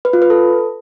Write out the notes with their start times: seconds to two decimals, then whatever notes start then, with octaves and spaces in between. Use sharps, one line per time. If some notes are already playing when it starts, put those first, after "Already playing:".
0.05 B4
0.13 F4
0.22 B4
0.30 A4